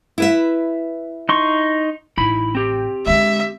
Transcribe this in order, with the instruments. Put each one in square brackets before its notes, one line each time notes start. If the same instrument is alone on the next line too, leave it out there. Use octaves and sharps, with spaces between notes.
[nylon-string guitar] E4 B4 E5
[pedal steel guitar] D#4 C6 C#6
[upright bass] A1 [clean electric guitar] D#4 E4 B5
[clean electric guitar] C4 G4
[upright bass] D3 G#3 [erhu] E5